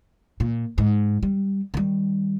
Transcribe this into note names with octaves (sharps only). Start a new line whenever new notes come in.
A#2
G#2
G3
D#3 G3